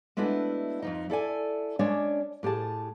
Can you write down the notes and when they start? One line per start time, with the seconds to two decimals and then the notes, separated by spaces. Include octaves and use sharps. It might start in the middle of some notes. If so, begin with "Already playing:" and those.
0.17 G#3 A3 B3 D4 E4 F#4
0.82 F2 F3 D#4
1.10 E4 A4 D5 G#5
1.79 G#3 C#4 D4 C#5 D5
2.43 A2 G4 G#4 A5